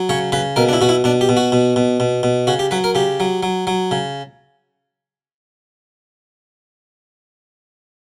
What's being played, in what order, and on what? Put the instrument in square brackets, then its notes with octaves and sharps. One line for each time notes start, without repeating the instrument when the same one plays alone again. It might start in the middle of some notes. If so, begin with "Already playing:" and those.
Already playing: [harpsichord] F#3
C#3 C#5
C#3 B4
B2 A#4
D4
E4
B2 F#4
E4
B2 D4
G4
B2
F#4
B2
B2
B2
B2
C#3 F#4
G4
F#3 B4
A#4
C#3 G4
F#3
F#3
F#3
C#3